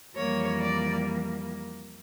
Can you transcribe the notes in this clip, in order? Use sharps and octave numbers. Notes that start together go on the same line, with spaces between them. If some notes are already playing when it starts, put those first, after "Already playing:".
F2 E3 G3 A#3 C#5
D5